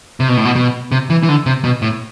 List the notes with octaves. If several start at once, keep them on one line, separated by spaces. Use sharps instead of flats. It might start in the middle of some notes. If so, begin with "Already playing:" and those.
C3
B2
A2
B2
B2
C3
E3
E3
D3
C3
B2
A2